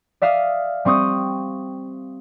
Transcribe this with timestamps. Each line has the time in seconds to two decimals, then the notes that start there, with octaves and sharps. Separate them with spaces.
0.22 D5 E5 F5 D#6 F6
0.85 G3 C4 C#6 D#6 G6